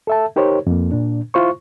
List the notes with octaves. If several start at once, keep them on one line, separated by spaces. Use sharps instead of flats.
A4 E5 A5
D#4 G4 A#4 C5 C#5
F2 A#3
A#2 D4
E4 F4 C5 C#6